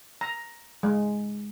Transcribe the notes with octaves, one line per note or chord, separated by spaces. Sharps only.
A#5
G#3